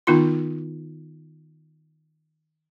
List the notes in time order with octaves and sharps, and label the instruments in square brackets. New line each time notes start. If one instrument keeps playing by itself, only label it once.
[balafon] D#3 B3 D#4 F4 C6